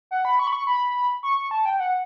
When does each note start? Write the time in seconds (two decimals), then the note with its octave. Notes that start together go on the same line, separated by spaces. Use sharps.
0.11 F#5
0.25 B5
0.39 C#6
0.47 B5
0.52 C#6
0.67 B5
1.23 C#6
1.37 C#6
1.51 A5
1.65 G5
1.80 F#5